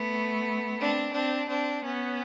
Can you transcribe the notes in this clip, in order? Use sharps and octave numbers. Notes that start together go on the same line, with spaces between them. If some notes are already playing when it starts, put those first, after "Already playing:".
Already playing: A3 B3
C4 D4
C4 D4
C4 D4
B3 C#4